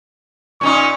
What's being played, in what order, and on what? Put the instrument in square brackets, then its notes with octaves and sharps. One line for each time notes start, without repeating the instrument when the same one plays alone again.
[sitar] A#2 C#4 D#4 [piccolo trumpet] C#6